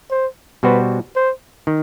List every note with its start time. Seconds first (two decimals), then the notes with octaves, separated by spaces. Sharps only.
0.11 C5
0.63 B2 G3 B3 F#4 B4 C5
1.16 C5
1.67 D#3